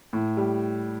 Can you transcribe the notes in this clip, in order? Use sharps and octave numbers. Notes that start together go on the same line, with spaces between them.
A2
G3